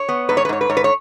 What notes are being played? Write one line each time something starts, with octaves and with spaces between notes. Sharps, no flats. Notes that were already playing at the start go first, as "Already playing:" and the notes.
Already playing: C#5
B3
G#2 B4
C#5
B4
G#2 C#5
B4
G#2 C#5
B4
C#5